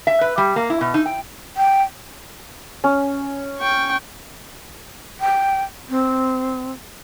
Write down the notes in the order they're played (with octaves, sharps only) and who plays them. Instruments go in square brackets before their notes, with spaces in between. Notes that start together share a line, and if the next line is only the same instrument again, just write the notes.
[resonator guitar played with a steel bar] E5
B4
G3
A#3
E4
B2
D#4
G5
[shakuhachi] G5
[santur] C#4
[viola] G5 C#6
[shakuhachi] G5
C4